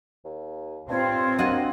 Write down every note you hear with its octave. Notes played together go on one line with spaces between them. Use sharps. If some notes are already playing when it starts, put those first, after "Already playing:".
D#2
G2 C4 F4 C#5
A#3 D4 F#4 D#5